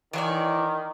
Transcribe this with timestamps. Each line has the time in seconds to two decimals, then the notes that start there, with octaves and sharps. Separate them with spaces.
0.13 D#3 E3 C#5 D5